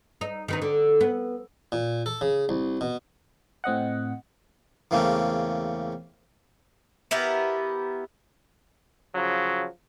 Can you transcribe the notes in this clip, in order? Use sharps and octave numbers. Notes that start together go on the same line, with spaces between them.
D#4
D#3 B3 D#4
D3
B3
A#2
A4
C#3
C2
B2
A2 C4 D#5 F#5
E2 C#3 A3 A#3 C4 C#4
B3 E4 G4 A#4
C#3 F3 F#3